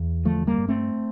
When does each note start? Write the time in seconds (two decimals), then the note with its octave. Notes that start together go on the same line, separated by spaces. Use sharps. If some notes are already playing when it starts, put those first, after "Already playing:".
Already playing: E2
0.25 D3 F3 A3
0.47 G3 A#3
0.58 G2
0.68 A3 C4